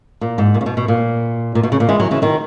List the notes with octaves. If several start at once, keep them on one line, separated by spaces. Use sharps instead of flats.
A#2
G#2
A#2
C#3
B2
B2
A#2
A#2
B2
C#3
A#2
E3 G#3
D#3 F#3
C#3 E3
B2 D#3